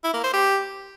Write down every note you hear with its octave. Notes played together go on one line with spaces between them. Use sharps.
E4
A#3
C5
G4